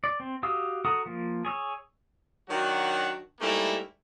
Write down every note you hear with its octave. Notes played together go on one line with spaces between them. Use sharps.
D5
C4
F#4 G4 F5 D#6 E6
F#4 A4 F#5 A#5 D#6
F3 A#3
G#4 C#5 E6
D#3 F#3 D4 F#4
G#2 G3 A3 A#3 E4